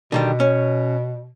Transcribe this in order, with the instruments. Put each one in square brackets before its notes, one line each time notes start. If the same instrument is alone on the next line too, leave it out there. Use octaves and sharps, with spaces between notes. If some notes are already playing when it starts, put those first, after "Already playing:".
[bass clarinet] B2 [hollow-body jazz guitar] D3 D#3 G3
[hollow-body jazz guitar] C#4